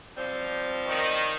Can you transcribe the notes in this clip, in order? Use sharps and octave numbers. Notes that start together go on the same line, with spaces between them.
F3 G3 C4
D#3